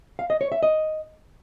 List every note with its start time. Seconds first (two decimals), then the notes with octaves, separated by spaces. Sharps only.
0.19 F5
0.30 D#5
0.41 C#5
0.52 E5
0.63 D#5